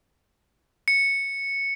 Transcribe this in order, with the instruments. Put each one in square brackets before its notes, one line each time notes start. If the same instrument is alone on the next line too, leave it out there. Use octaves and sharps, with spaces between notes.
[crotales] C#7